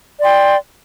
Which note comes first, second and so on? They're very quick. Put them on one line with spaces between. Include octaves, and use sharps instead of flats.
D5 C6 G5